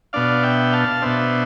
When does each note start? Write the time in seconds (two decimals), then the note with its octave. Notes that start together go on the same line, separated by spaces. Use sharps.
0.13 B2 B3 D4 D5 F5
0.43 E5 G5
0.73 F5 A5
1.02 B2 B3 D4 C5 E5